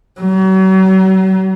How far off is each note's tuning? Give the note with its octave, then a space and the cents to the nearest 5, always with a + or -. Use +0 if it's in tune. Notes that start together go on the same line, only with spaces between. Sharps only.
F#3 +40